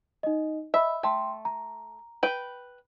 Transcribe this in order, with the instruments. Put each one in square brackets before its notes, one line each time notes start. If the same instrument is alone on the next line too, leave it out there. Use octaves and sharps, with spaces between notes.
[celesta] D#4 D#5
[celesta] D#5 B5 [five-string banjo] E5
[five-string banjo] A3 [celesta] G5 C6
[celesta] A#5
[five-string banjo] B4 G5